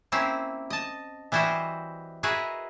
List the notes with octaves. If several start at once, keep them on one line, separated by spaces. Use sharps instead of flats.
A#3 C4 C#4 E4
D#5 A5
E3 G3 E4 F#4 C5 D#5
E4 F#4 G#4 A#4 B4 D#5